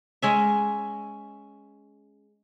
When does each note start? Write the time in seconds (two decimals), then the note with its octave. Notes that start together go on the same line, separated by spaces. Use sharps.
0.22 G#3 C#4 E5